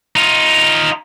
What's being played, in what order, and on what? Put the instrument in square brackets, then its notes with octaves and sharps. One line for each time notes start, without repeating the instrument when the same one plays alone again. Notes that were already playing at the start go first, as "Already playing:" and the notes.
[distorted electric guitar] D#4 F4